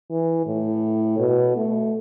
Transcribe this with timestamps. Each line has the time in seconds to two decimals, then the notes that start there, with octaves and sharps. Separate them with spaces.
0.11 E3
0.46 A2
1.19 B2
1.57 A3